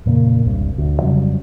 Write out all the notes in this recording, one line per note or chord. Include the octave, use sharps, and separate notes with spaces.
F2 A#2 C#3 A#3
E1 C2 G2
D2
F2 C#3 F#3 G3